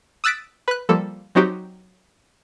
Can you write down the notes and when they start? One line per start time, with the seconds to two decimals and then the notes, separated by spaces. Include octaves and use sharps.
0.24 D#6 E6 F#6 A6 B6 D7
0.68 B4 F#6
0.89 F3 G3 A#3 A4
1.35 F#3 C4 D#4 F#4 G4